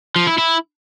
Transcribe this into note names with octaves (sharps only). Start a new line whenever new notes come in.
F3
E4
E4